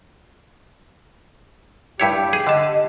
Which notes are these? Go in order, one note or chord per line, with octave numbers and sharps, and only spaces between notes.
G2 E4 G4 C#5
G#4
D3 D#5 A5